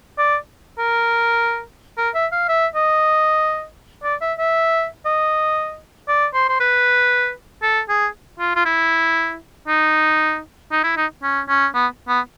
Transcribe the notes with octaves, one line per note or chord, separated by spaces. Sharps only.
D5
A#4
A#4
E5
F5
E5
D#5
D5
E5
E5
D#5
D5
C5
C5
B4
A4
G#4
F4
F4
E4
D#4
D#4
E4
D#4
C#4
C#4
B3
B3